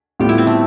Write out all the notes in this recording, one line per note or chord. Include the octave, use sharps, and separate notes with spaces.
A2 G3 B3 F4 G4
E4
C4
A3